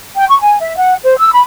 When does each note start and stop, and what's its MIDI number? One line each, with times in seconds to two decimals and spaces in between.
0.16 0.25 79
0.28 0.41 85
0.41 0.56 80
0.60 0.75 76
0.77 0.94 78
1.04 1.14 72
1.18 1.32 88
1.32 1.45 83